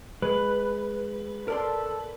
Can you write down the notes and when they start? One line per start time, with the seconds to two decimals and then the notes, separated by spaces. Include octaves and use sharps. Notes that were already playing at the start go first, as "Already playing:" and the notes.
0.22 G#3 B4
1.48 A4 A#4 D5 C6